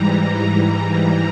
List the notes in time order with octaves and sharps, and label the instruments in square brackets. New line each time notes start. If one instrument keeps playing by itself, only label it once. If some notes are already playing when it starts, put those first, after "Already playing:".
Already playing: [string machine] G#2 E3 G3 A#5